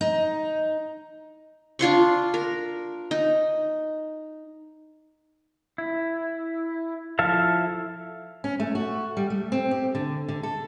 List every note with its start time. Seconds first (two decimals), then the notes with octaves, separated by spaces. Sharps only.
0.01 D#4
1.79 D4 F4 C6 C#6
2.34 A#4
3.11 D#4
5.78 E4
7.19 F3 E4 A4 E5 F5
8.44 C#4
8.60 A3
8.75 F#4
9.17 G3
9.30 A3
9.52 C4
9.71 G4
9.95 D3
10.28 D3
10.43 A4